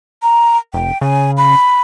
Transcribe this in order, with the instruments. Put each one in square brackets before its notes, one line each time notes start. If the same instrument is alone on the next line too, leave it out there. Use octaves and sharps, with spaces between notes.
[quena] A#5
[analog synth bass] F1 [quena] G5
[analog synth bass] C#3 [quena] G#5
[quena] B5